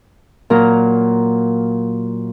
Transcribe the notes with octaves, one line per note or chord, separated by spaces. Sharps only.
A#2 F#3 A#4 A#5